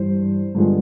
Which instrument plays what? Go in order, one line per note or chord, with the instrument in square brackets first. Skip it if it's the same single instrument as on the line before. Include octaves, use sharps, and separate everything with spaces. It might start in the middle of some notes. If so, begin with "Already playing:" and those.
Already playing: [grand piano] G2 E3 G3 C5
G2 D3 F3 G#3 B3